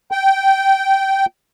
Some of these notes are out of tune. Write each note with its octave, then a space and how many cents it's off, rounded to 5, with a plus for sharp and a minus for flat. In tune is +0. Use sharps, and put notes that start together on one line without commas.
G5 -15